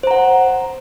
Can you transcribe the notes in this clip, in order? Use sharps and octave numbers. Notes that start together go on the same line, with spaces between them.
C5 F#5 A#5